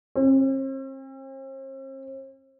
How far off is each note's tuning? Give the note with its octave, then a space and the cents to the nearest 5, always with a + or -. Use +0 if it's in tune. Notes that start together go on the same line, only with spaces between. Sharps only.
C4 +45